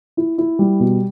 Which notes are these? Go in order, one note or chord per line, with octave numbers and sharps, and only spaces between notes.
E4
E4
G3
B2